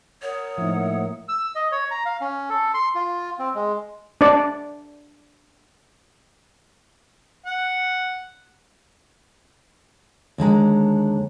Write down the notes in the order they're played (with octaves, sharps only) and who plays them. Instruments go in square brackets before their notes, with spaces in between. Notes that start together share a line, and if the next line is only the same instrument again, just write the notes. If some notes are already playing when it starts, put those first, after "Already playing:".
[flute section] A#4 F#5 D#6 [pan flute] C#5
[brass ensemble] A2 A#3 E5 [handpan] F3 D#4
[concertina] E6
D#5
C#5
A#5
F5
C#4
A4
C6
F4
C4
G#3
[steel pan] D4 D5
[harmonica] F#5
[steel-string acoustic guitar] D#2 D3 G#3 A#5